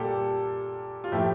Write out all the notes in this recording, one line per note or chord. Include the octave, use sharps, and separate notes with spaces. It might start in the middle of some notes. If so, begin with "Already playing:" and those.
Already playing: A#2 G3 A#3 G4 A4
F4
A2 F3 A3 E4 G4